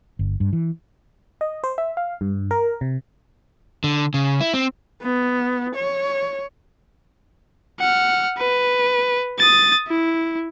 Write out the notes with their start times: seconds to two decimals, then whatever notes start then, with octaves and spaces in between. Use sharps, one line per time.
0.19 G1
0.40 G2
0.53 E3
1.41 D#5
1.64 C5
1.78 E5
1.97 F5
2.21 G2
2.51 A#4
2.81 C3
3.84 D3
4.14 C#3
4.41 E4
4.54 C4
5.02 B3
5.75 C#5
7.80 F#5 F6
8.38 B4
9.39 D#6 A6
9.88 E4